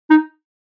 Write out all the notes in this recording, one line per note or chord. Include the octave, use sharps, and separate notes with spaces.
D#4